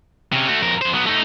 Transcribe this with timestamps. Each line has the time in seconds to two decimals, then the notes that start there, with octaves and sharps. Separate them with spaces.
0.32 C3 C#4
0.48 A3 F#4
0.61 F2 A#4
0.81 F2 C5
0.94 F#3 B3
1.06 A3 D#4